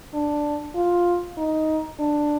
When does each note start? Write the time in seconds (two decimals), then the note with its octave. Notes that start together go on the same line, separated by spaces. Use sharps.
0.14 D4
0.75 F4
1.37 D#4
1.99 D4